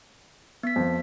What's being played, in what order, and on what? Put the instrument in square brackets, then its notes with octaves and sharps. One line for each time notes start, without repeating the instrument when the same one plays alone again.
[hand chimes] B3 B6
[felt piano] F2 F3